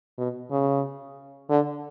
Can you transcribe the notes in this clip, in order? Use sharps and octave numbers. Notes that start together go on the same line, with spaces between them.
B2
C#3
D3